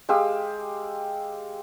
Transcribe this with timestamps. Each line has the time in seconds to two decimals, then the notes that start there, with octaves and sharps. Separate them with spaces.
0.09 G#3 G4 F5 E6